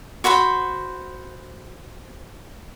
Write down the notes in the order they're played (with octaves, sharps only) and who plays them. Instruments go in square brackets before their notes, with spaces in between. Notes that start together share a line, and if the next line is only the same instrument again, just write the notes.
[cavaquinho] F#4 C5 F#5 B5